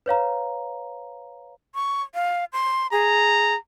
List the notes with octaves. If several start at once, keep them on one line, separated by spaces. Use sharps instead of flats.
B4 C#5 F5 A#5
C#6
F5
C6
G#4 A#5